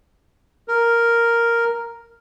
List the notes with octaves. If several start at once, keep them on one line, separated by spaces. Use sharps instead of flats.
A#4